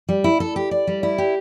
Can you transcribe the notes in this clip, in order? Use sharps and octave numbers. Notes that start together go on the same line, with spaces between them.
G3
E4
A4
G4
D5
G3
E4
G4